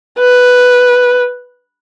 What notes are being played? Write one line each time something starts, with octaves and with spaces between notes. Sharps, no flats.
B4